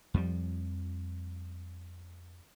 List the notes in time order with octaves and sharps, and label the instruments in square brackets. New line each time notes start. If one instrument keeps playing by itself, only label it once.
[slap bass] F2 F3 G3